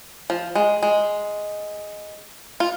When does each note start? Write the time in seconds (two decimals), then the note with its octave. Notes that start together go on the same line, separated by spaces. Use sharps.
0.30 F3
0.55 G#3
0.83 G#3
2.60 F4